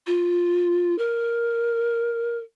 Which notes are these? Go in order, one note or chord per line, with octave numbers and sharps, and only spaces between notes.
F4
A#4